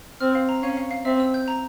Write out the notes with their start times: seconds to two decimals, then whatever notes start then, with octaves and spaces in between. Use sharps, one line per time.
0.20 C4 F6
0.35 F5
0.49 A#5
0.63 C#4 F5
0.77 F5
0.91 F5
1.05 C4 E5
1.20 E6
1.34 G6
1.48 A#5